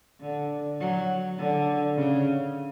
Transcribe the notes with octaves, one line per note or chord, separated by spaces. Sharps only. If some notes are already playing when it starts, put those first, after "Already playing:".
D3
F#3
D3
C#3